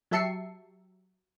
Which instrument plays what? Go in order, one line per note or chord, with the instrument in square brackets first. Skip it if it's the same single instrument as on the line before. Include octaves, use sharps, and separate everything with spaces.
[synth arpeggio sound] F#3 G4 E5 A5 C7 C#7